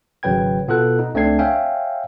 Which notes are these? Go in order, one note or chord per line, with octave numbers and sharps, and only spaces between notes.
G#1 C#3 F#3 B4 G5 G#6
B2 B3 F4 A4 F#6
D#4
C#2 A3 C4 D4 G#6 C7
C#5 E5 F5 G5 G#5